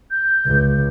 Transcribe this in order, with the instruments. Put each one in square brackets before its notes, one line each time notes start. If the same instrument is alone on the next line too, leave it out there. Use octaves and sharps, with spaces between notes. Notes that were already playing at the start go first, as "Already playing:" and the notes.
[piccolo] G6
[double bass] C#2